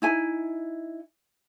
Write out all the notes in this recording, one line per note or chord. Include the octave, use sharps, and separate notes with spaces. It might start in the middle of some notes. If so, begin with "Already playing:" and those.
D#4 E4 G#5